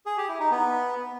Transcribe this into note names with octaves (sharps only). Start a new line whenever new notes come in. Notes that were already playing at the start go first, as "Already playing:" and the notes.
G#4
G4
E4
D#4
B3